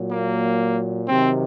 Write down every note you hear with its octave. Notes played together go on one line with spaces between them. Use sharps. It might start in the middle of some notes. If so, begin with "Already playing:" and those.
Already playing: A#2 F#3
A#3
C3 D#3 F#3 C4